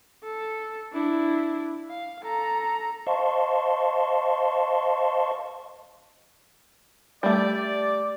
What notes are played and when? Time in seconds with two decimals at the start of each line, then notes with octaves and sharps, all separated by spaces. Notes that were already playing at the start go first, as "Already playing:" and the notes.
0.23 A4
0.92 D4 E4
1.89 F5
2.22 A4 A#5
3.07 C5 D#5 F5 A5 C6 C#6
7.23 G3 A3 D5